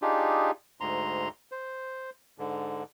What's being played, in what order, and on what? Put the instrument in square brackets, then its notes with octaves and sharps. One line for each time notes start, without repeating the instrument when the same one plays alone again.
[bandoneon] D4 D#4 F4 G4 G#4
D2 G#2 A#5 C6
C5
G#2 D3